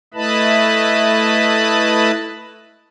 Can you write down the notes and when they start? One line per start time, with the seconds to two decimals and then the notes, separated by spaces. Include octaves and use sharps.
0.14 A3 E4 B4 D#5 A5 B5